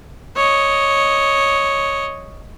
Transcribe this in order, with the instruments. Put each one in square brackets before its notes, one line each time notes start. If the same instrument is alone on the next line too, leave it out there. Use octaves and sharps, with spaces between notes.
[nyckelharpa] C#5 D#5